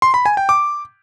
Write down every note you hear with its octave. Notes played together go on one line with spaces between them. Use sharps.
C6
B5
G#5
G5
D6